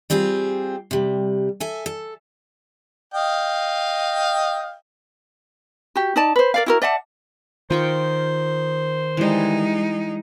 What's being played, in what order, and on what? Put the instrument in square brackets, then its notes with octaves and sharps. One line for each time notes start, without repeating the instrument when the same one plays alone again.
[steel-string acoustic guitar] G3 C4 F4 G4 G#4
C3 G3
A4 E5 G#5
A4
[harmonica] D#5 F5 G5
[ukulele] F#4 G4
D#4 D5 A5
B4 C5
A#4 D5 F5
E4 F#4 A#4
D5 E5 F#5 A5
[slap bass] D#3 [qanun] F4 G5 C#6 [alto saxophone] C5
[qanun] E3 G3 [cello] G#3 D#4